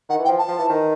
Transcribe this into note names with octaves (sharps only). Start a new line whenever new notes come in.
D#3 F#5
E3
G5
F3
A5
F3
E3
D#3